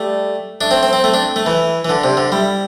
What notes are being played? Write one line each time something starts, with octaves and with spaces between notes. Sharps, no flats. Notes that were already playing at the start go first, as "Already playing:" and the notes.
Already playing: G3 A3
A3 D4
C4
C4
C4
A3 C4
D4
A3
E3 E4
E3
D3 D4
C3
D3
G3 E4